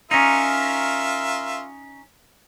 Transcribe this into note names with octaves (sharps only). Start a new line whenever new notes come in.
C#4 D#4 F4 A#4 E5